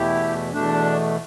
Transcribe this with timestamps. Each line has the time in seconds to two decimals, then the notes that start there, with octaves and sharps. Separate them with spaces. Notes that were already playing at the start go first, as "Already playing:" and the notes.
Already playing: E2 B2 A3 E4 G4
0.53 E2 B2 A3 D4